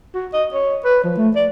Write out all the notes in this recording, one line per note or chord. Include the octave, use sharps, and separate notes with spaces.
F#4
D#5
C#5
B4
F3
A3
D5